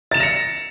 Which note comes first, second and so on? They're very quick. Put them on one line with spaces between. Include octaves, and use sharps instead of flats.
A6 E7 F7 A#6 C#7